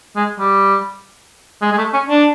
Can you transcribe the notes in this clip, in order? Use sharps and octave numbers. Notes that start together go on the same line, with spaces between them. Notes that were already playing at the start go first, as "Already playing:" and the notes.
G#3
G3
G#3
G#3
A3
C#4
D4